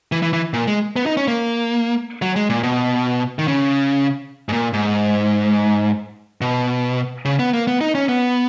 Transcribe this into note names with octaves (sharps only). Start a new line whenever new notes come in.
E3
E3
E3
A#2
G#3
B3
D#4
C#4
A#3
F#3
G#3
A#2
B2
D#3
C#3
G#2
A#2
G#2
B2
C#3
B3
A#3
B3
D#4
C#4
B3